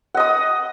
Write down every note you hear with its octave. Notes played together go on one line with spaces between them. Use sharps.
D#5 F#5 D#6